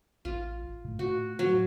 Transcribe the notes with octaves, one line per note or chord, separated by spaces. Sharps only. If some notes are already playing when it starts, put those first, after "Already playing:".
A1 F4
A2
A2 F#4
F#3